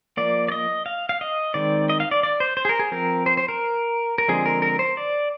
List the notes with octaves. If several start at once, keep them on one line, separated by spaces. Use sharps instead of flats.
F3 A#3 D5
D5
D#5
F5
F5
D#5
D#3 G#3 C4 D5
D#5
F5
D5
D5
C5
C5
G#4
A#4
G#4
F3 C4 A#4
C5
C5
A#4
A#4
D3 F3 G#3 C4 G#4
A#4
A#4
C5
D5